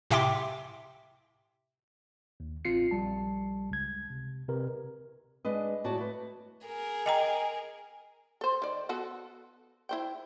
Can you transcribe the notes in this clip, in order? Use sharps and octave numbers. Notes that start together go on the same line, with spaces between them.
A2 C3 E5 G5 C6 D6
D#2
A1 C4 F4 C7 C#7
A#1 G3 A5
C#2 G#6
C3
C3 A#4 B4
G#3 D4 B4 D#5
A2 F#4 D5 A5
A3 B4
G#4 A#4
D#5 G5 A#5
A4 C5
D#3 D5
B3 F#4 A4
E4 C5 G5